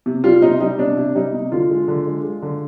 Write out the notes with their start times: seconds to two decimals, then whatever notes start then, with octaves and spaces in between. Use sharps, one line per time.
0.06 C3
0.24 G3 F4
0.42 C3 D#4
0.61 G3 D#4
0.78 C3 D4
0.97 C3
1.15 G3 D#4
1.33 C3
1.52 D3 F4
1.71 G#3
1.88 D3
2.07 G#3
2.25 G#3
2.42 D3